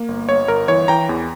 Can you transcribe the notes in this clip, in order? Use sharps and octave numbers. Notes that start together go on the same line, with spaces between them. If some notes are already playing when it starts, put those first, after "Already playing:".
Already playing: A#3
G1
G1 C#5
G1 A#4
E3 C#5
E3 G5 A#5
E2